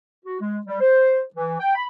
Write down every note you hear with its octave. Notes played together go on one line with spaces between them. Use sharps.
F#4
G#3
G3
C5
E3
G5
B5